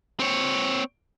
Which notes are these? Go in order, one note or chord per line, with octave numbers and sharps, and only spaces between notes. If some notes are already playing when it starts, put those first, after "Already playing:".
C4 C#5